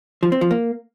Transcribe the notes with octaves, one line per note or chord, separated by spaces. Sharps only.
F3
C4
F3
A#3